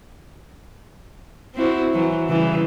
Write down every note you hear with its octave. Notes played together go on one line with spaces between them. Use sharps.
C4 E4 F#4
E3 F#3
C#3 E3 G3